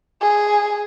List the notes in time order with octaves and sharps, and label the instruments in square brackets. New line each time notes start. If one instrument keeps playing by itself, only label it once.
[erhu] G#4